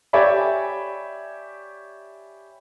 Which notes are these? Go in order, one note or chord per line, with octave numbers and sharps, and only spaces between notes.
G4 C#5 D5 E5 G#5 B5